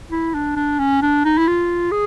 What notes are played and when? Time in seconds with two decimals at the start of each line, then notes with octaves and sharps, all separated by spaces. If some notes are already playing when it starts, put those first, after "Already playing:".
0.11 E4
0.34 D4
0.56 D4
0.79 C#4
1.02 D4
1.25 D#4
1.38 E4
1.47 F4
1.91 G#4